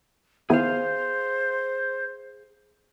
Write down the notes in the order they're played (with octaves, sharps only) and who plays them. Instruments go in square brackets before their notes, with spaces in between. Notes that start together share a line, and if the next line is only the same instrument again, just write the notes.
[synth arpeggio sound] D#3 B3 E4 [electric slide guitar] G#4 F5 [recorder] C5